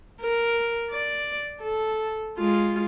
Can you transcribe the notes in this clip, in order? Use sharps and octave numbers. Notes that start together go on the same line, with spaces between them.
A#4
D5
A4
G#3 F4